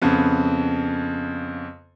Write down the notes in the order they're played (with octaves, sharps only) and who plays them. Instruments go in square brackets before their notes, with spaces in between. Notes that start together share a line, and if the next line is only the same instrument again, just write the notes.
[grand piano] F2 C#3 B3